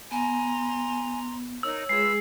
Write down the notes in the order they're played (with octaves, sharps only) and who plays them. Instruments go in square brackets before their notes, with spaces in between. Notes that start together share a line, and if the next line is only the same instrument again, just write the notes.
[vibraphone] B3 [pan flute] G#5 [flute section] A#5 C6
[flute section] D#4 A#4 [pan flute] C#5 [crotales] E6
[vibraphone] G#3 G#4 [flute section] F4 B4 E6 [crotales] C7